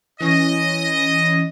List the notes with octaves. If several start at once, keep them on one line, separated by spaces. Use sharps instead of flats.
E3 C#4 D#5